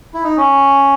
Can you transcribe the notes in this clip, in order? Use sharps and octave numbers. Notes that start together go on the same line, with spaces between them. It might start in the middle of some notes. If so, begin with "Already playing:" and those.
E4
D#4
C#4